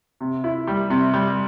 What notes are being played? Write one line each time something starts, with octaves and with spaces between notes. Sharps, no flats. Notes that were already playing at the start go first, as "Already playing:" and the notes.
C3
E4
G3
C3
G3